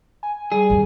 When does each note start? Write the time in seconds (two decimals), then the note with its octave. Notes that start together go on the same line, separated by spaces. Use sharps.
0.23 G#5
0.52 G3 G#4
0.70 F#1 D#2